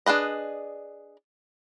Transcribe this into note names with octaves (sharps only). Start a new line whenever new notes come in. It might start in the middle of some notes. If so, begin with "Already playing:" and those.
D4 G#4 B4 D#5